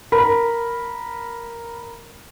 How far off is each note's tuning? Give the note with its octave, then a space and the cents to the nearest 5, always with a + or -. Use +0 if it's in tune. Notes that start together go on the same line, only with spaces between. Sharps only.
A#4 +0 B5 -10